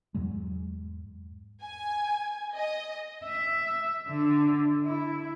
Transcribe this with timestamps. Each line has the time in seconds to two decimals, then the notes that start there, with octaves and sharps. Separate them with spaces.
0.15 E2 G#2 F#3 G#3
1.62 G#5
2.56 D#5
3.24 E5
4.08 D3
4.85 E4